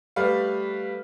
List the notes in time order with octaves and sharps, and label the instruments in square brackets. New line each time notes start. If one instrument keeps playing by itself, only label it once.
[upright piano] G3 A3 B4 F5